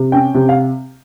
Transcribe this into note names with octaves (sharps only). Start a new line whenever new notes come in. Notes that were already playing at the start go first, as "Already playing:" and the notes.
Already playing: C3
C#4 G5
C3
F5